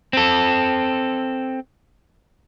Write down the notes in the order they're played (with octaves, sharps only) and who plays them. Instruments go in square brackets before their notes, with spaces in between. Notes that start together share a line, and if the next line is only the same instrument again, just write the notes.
[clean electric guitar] C4 A4